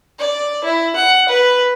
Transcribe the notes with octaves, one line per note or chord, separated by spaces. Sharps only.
D5
E4
F#5
B4